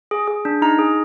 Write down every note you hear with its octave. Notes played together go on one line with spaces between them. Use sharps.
G#4
G#4
D4
D#4 A#5
G#4